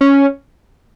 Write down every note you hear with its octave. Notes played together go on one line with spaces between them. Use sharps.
C#4